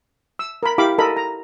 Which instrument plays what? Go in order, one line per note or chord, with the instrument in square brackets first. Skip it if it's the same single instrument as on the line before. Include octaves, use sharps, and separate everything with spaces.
[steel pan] E6
A#4 B5
E4 G4 F5 B5 D6
A4 A#4 D#5 B5
A#5